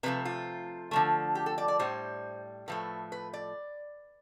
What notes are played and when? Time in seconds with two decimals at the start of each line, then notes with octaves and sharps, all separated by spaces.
0.03 C3 F3 A3 B4
0.25 F4
0.91 D3 F3 A3
1.35 G4
1.46 A4
1.58 D5
1.68 D5
1.79 A2 G3 C5
2.68 A2 F3 A3 B4
3.12 B4
3.33 D5